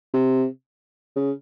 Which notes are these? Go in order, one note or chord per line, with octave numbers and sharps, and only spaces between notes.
C3
C#3